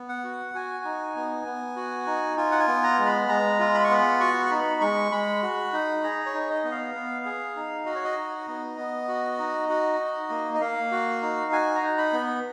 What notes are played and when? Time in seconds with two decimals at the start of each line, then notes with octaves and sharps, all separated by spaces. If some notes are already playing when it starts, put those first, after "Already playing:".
Already playing: B3
0.09 F#5
0.24 F#4
0.54 F#4 G#5
0.85 D#4
1.16 B3
1.46 B3
1.76 F#4
2.07 D#4
2.37 F4 G#5
2.52 F#5
2.60 G#5
2.68 B3
2.83 A#5
2.99 G#3
3.06 B5
3.28 G#3 A#5
3.59 F4
3.74 B5
3.84 C#6
3.90 B3 B5
4.20 F#4 C#6
4.46 C#6
4.51 D#4 B5
4.81 G#3 C#6
5.12 G#3 B5
5.43 F#4
5.73 D#4
6.03 G#4 A#5
6.26 C#5
6.34 D#4
6.50 D#5
6.64 B3
6.71 F5
6.95 B3
7.25 G#4
7.56 D#4
7.86 F#4 D#5
7.95 C#5
8.04 D#5
8.17 D#4
8.48 B3
8.78 B3
9.08 F#4
9.39 D#4
9.69 F#4
10.00 D#4
10.30 A#3
10.54 D#5
10.61 A#3 F5
10.91 F#4
11.22 D#4
11.52 F#4 G#5
11.75 A#5
11.82 D#4
11.98 B5
12.13 B3